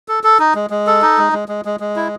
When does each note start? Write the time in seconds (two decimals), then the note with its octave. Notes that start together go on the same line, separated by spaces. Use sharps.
0.08 A4
0.24 A4
0.39 D#4
0.55 G#3
0.70 G#3
0.87 A4
1.02 D#4
1.18 G#3
1.33 G#3
1.48 G#3
1.65 G#3
1.80 G#3
1.96 E4